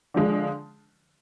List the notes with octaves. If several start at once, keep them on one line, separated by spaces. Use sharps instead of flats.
D3 F3 G#3